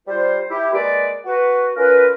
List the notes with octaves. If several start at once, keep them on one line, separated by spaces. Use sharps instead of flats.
G3 F4 C5
E4 G4
G#3 A#3 B4 D5
F#4 B4
C#4 F4 A#4 B4